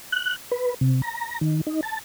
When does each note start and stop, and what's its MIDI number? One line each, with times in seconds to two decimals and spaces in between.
0.12 0.36 90
0.52 0.74 71
0.81 1.01 48
1.02 1.39 82
1.41 1.61 51
1.67 1.81 63
1.83 1.99 81